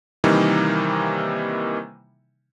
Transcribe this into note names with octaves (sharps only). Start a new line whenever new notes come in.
C3 D#3 E3 G3 A#3 D#4